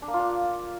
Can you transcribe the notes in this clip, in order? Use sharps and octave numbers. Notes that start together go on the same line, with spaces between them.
D4
A#3
F4
D4